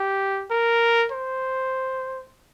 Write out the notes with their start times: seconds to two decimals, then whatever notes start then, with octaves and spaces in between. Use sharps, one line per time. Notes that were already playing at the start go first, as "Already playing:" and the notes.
Already playing: G4
0.50 A#4
1.12 C5